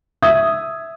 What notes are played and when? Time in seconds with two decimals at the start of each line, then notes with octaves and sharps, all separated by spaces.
0.22 E5 D#6 G#6